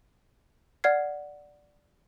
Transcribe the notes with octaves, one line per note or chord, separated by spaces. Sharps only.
D5 F#5 F6 G#6 C7